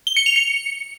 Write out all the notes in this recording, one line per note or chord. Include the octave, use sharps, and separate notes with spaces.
G7
C#7
F7
C#7